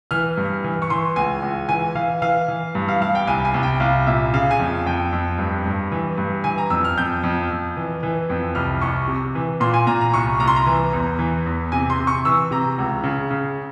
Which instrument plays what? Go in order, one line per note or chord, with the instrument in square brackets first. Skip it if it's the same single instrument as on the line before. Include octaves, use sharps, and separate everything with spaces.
[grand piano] E3 F6
G2
E3
C#6
E3 C6
C#2 G#5
C#2
E3 G#5
E3 F5
E3 F5
E3
G2
F5
G2 F5
G5
C2 G#5
G#5
C2
G5
C2 F5
A#2 E5
C#3 F5
G#5
F2
F2 G5
F2
G2
G2
E3
G2
E3 G#5
A#5
F2 E6
F6
F2 G6
F2
F2
E3
E3
F2
C2 F6
C2 C#6
C3
E3
A#2 C6
G#5
A#2 A#5
A#5
C2 C#6
C2 A#5
C6
A#5
E3
E2
E3
E2
C3 G#5
C6
C3
C#6
E3 E6
C3 A#5
C#2
C#3
C#3